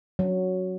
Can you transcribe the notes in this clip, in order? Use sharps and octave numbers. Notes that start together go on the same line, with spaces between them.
F#3